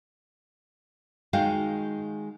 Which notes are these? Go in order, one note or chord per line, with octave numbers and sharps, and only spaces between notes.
D#3 G#3 F#4 D#5 F5 G5